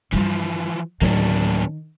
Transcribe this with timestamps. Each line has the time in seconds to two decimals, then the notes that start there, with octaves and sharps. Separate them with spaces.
0.12 G2 E3 F3 G3
1.01 D2 A2 D#3 F#3 A#3 C#4 D4